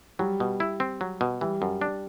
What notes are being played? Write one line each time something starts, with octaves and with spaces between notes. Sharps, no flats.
F#3 G3
B2
E4
C4
F#3
B2
E3 G3
F#2
D4